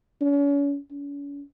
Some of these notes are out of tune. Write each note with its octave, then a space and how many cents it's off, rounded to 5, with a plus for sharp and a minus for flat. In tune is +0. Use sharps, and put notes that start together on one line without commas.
C#4 +40
C#4 +40